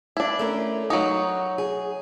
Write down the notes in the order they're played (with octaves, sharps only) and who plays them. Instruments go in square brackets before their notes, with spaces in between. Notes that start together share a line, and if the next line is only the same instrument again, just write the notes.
[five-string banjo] D4 E4
[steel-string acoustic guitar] A3 C#4 A#4
[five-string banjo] F#3 D#4 [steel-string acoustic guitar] C#5
[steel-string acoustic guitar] G#4